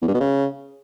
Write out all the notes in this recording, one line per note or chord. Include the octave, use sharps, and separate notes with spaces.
E2
G2
B2
C#3